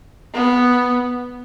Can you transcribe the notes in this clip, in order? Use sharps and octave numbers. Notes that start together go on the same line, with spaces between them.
B3